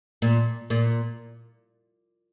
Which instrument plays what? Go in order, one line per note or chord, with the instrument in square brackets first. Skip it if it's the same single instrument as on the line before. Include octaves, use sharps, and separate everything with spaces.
[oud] A#2
A#2